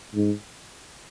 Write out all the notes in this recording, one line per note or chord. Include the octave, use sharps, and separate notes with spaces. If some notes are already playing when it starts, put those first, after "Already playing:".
G#2